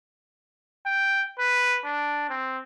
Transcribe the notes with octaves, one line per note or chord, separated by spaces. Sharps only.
G5
B4
D4
C4